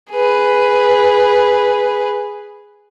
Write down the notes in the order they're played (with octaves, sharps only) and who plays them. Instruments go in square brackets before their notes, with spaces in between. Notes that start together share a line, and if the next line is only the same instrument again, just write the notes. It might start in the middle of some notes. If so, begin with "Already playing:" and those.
[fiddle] G#4 B4